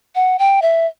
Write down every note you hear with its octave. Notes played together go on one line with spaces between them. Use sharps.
F#5
G5
E5